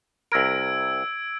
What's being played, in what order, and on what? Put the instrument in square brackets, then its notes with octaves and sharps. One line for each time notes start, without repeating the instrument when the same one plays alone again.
[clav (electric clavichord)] C2 A#4 [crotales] E6 G#6 D7